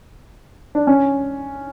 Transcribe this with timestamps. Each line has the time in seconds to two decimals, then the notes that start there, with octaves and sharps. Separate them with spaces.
0.75 D4
0.87 C#4